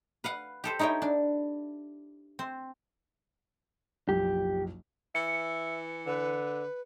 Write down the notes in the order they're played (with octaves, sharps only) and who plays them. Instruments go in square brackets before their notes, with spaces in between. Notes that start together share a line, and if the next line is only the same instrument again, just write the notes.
[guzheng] B4 F5 F#5
G4 A4 C5
D#4 E4 C#5 D#5 G5
D4
C4
[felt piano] F#1 B1 F3 [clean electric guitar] G4
[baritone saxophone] E3 [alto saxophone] E5 [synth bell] C#7
[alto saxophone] D3 [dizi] B4